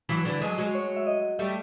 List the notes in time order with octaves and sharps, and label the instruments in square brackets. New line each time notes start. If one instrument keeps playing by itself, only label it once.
[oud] E3 F#3
D3 E3
[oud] F#3 G#3 [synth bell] D#5
[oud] F#3 G#3
[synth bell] C#5
E5
D#5
[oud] G3 A3 [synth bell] E5